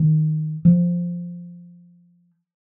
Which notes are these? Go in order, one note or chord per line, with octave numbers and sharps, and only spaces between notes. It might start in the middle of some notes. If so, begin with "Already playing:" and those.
Already playing: D#3
F3